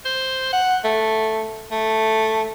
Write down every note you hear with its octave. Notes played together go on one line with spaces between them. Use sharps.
C5
F#5
A3
A3